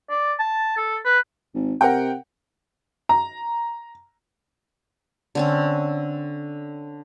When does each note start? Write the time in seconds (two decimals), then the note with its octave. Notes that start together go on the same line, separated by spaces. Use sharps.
0.10 D5
0.39 A5
0.77 A4
1.05 B4
1.55 G#1
1.81 C3 A#4 F#5 G5
3.09 A#5
5.35 D3 C4 C#4